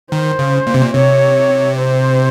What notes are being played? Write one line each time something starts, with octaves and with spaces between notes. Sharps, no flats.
D#3 C5
C#3
A#2
C3
A#2
C3 C#5
C5